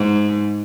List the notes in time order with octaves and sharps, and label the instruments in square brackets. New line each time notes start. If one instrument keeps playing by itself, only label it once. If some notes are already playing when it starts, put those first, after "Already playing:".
Already playing: [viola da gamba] G#2